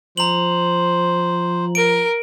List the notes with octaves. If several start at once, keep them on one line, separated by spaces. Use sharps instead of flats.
F3 C5 A#5 F#7
A#4 D7